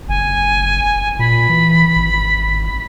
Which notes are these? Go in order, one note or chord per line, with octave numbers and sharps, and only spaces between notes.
F#1 G#5
A#2 B5
E3
G#1